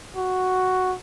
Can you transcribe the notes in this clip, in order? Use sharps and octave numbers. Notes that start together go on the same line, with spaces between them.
F#4